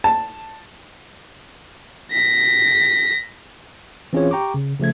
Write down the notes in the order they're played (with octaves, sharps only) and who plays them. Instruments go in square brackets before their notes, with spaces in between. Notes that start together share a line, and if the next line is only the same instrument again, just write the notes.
[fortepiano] A5
[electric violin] A#6 B6
[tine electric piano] E3 C4 C#4 F4 G#4 C#5
G4 G5 A#5 C#6 D6
C#3
C#3 F3 A3 G#6